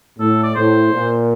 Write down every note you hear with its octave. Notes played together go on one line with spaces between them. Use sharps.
A2 A4
D5
A2 C5
A#2